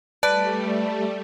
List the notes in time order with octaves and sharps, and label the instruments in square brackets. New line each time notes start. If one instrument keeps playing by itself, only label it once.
[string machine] G3 A3 [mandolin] B4 [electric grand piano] D5 [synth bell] A5